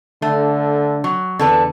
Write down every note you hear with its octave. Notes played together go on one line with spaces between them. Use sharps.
D3 A3
F#3
E2 D3 A4 B4